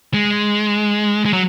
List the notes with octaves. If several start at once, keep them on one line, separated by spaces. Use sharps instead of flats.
G#3
G#3
F#3